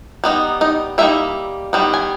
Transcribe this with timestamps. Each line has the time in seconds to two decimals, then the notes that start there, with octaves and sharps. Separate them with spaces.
0.24 G3 B3 D#4
0.61 D#4 D#5
0.98 G3 A#3 D#4 E4 E5
1.73 D#3 G3 B3
1.94 G#5